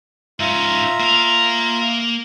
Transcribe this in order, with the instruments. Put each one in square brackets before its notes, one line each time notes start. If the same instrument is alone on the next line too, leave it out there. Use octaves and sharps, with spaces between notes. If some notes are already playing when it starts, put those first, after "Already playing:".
[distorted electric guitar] G#2 C#4 [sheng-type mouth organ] F4 E5 A#5
[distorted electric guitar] A#3 F5